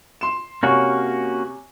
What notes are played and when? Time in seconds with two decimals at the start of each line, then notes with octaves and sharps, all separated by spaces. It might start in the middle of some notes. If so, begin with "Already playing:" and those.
0.21 C6 E7
0.63 C3 A#3 C#4 F#4 C#5 G#5 C#6